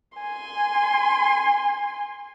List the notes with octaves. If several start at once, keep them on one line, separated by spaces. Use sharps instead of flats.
G#5 C6